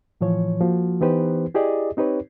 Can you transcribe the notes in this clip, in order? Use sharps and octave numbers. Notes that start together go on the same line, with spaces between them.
A2 E3 F3 C#5
F3 A#3 F#4
E3 B3 D#4 G4 B4 C5
E4 G4 G#4 D5 D#5
C4 D#4 G4 B4 C#5